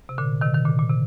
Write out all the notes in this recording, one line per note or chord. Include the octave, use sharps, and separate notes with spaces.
C3
A#2 D3
C3 D#3
D#3
A#2 D3
A#2
C3